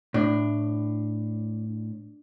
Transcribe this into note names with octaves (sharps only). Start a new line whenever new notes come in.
A2 D4